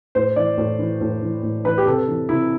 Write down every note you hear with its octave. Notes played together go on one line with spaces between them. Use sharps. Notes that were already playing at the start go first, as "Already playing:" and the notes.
A2 C5
E3 D5
A2
E3
A2
E3
A2
E3 B4
G4
C3 A4
E3
C3 E4